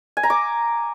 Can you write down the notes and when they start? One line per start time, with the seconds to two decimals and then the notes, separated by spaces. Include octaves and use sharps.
0.17 G#5
0.23 A#5
0.30 D6